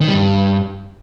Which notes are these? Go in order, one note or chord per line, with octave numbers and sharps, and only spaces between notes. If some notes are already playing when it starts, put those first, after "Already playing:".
D#3
G3
G2